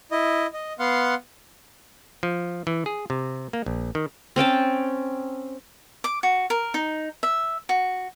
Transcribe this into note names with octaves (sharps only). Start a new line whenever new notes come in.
E4 D#5
D#5
B3 F5 F#5 C6
F3
E3
G#4
C3
A#3
A#1
D#3
C4 C#4 G5 A5
D6
F#4
A#4
D#4
E5
F#4